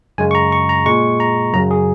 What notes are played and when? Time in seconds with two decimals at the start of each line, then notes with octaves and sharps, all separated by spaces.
0.18 F#2 C#3 G#3 G#5
0.31 C#6
0.35 A#5
0.52 C#6
0.69 A#5
0.86 A#2 G#3 C#6
1.20 A#5
1.54 F#2 C#3 F#3 A#5
1.71 G#4